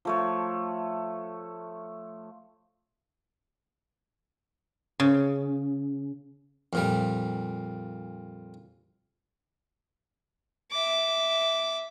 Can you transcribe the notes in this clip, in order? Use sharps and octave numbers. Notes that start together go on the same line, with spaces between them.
F3 A3 C#5
C#3
F2 A#2 G3
E5 D6